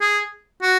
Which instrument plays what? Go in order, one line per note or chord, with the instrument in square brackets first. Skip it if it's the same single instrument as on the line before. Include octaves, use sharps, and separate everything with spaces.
[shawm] G#4
F#4